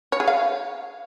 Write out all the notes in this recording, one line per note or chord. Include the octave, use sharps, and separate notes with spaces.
C#5
G#4
F5